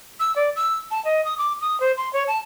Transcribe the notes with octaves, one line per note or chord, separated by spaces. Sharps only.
E6
D5
E6
A5
D#5
D#6
D6
D#6
C5
C6
C#5
A5